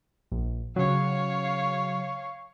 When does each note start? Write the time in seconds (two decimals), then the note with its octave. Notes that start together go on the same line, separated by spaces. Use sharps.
0.32 A#1
0.76 C#3 F#3 C#5 F5